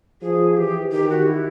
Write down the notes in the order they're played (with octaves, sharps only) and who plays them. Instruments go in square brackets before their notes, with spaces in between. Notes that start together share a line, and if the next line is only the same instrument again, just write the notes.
[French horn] F3 [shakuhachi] G#4
[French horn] E3 [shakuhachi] G4
[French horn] D#3 [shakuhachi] G4
[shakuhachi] F#4
E4